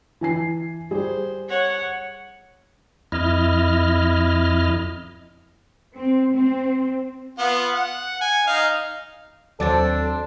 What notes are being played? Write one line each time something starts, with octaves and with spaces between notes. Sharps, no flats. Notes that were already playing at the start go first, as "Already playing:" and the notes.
E3 G#5 C7
G3 G#4 C5
C#5 F#5
F2 E4 D#5 F6
C4
C4
B3 F4
F#5
G#5
D#4 F5
D#2 F#3 C4 D4 A4 A6